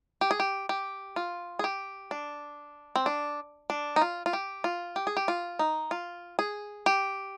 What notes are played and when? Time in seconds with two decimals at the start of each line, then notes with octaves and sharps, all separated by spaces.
0.21 G4
0.31 G#4
0.40 G4
0.69 G4
1.16 F4
1.59 G#4
1.64 G4
2.11 D4
2.96 C4
3.06 D4
3.70 D4
3.96 D#4
4.01 F4
4.26 F4
4.33 G4
4.64 F4
4.96 G4
5.07 G#4
5.17 G4
5.28 F4
5.59 D#4
5.91 F4
6.39 G#4
6.86 G4